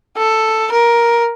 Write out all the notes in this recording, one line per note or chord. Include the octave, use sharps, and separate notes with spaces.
A4
A#4